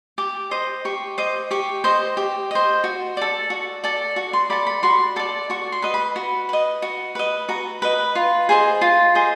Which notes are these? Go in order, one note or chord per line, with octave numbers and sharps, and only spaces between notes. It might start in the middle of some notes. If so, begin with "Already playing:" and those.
G4 D6
C5 D#5
G4 C#6
C5 D#5 D6
G4 C#6
C5 D#5
G4
C5 D#5
F#4
A4 D5
F#4
A4 D5
F#4
C6
A4 D5 B5
B5
F#4 C6
A4 D5 D6
F#4 C#6
C6
B4 D#5
B5
F#4
B4 D#5
F#4
B4 D#5
F#4 A#5
B4 D#5
F4
G#4 C5 D#5
F4
G#4 C5 D#5